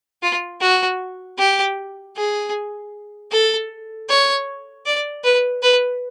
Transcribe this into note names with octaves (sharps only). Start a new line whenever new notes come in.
F4
F#4
G4
G#4
A4
C#5
D5
B4
B4